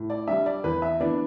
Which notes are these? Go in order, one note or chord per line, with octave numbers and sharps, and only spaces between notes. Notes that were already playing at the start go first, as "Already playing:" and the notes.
Already playing: A2
D5
G3 D4 E5
D5
E2 B4
E5
E3 B3 D4 D5